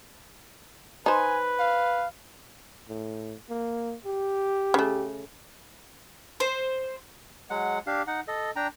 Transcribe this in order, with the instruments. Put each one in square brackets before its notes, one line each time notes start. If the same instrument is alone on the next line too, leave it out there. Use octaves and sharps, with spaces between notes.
[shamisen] D#4 C5 [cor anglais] B4 [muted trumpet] G#5
[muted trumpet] F5
[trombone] A2
A#3
G4
[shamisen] C#3 A3
[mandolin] C5
[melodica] F#3 G#3 F#5
D4 G4 F5
D#4 F#5
A4 D#5
D4 G5 A#5